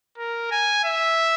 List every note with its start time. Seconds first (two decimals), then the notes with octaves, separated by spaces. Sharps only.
0.18 A#4
0.51 G#5
0.85 E5